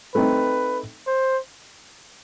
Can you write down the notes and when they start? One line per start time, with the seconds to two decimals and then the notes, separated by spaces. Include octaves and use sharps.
0.15 A3 C4 D#4 B4
1.07 C5